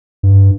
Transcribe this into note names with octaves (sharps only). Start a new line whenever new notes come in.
G2